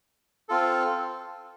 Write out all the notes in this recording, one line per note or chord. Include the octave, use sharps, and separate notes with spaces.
C4 F4 A4